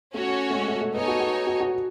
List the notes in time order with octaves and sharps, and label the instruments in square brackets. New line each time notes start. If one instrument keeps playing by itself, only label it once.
[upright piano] A3 [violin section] C#4 F#4 C#5
[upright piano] A3
G#3
A3
A3
[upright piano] B3 [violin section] D#4 A4 C#5 G#5
[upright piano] F#4
F#4
F#4
F#4